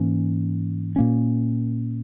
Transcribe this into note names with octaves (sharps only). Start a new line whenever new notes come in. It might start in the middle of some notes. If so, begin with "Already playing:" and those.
Already playing: G#2 E3 A#3 C#4
A#2 A#3 C#4